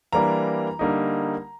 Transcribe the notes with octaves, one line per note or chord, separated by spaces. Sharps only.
E3 G3 A#3 D4 A#5
D3 G3 A#3 D#4